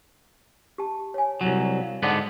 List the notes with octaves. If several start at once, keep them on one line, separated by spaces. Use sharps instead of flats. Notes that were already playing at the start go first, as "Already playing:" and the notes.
G4 A5
C#5 G#5
C2 F#2 F#3
F5
G#2 D3 B3 D5 F#5